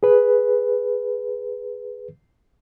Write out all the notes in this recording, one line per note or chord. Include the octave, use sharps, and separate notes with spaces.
G#4 B4